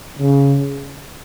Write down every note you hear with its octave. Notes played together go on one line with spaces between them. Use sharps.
C#3